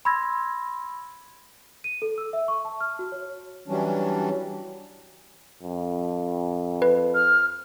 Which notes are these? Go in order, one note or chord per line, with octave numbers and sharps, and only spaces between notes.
B5 C6 E6 G#6 A#6
D#7
A4
E6
E5
C#6
A5
F6
F#4
C#5
E3 F#3 G3 C#4 D4
F2
B4
F6